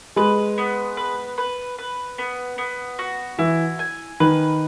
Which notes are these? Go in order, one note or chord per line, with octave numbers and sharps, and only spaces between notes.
G#3 B4
B3
B4
B4
B4
B3
B3
F#4
E3 E4
G#5
D#3 B4